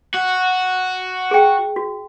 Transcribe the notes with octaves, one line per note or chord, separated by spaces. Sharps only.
F#4
G#4 G5
F#4